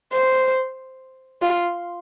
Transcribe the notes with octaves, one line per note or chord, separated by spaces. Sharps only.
C5
F4